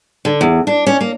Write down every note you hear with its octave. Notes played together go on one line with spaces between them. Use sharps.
D3
E2
D4
C#4
A#3